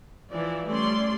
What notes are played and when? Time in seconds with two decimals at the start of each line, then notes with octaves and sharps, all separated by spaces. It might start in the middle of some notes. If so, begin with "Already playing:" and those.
0.30 E3 F3 D5
0.67 G3 A3 C#4 D5 C6